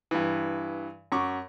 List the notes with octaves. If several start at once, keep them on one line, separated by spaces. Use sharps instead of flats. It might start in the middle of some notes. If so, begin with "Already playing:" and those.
G2 E3
F#2 C#6 D6